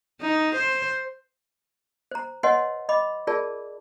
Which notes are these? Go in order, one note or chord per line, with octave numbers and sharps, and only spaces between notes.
D#4
C5
C5 A#5
B4 C#5 D#5 F#5 G#5 C6
D#5 B5 D6
F4 G#4 A#4 D5 A5